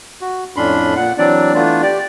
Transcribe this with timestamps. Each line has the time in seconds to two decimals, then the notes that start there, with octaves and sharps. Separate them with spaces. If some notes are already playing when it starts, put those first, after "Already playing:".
0.21 F#4
0.56 F2 A2 C#4 D4 B5 C6
0.96 A#2 F#5
1.18 E3 F#3 C4 D4 D5
1.55 E3 A3 B3 D4 F4
1.82 G4 D5